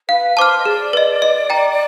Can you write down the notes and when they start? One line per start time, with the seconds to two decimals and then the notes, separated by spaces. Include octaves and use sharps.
0.09 B4 F5
0.37 C5 A5 D6 F6
0.58 D#5
0.65 G#4 D5
0.93 B4 D#5
1.22 D#5
1.50 G5 A#5